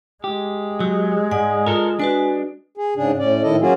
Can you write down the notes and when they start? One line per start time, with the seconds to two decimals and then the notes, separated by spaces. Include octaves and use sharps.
0.24 G#3 G4
0.80 F#3 G4
1.31 G#2 D5 F#5 G#5
1.66 F4 A4 A#4
1.99 D4 F#4 B4 G#5
2.77 G#4
2.96 G#2 C#3 D4 G#4
3.18 A2 C#4 D5
3.43 A2 D#3 E4 A4 D#5
3.61 F#3 A#3 C#4 F4 F#4 G#4